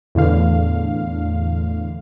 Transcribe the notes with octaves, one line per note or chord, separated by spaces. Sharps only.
E2 A2 D3 F5